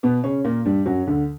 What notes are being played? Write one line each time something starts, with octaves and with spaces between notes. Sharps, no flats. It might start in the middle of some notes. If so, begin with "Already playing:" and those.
B2 B3
C#3 C#4
A#2 A#3
G2 G3
F#2 F#3
D2 D3